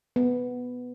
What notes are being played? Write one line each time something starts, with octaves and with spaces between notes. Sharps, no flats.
B3